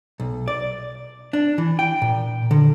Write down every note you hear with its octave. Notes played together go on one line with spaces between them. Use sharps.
B1
D5
D4
E3
G5
A#2
D3